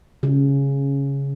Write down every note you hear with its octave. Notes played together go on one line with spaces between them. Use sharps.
C#3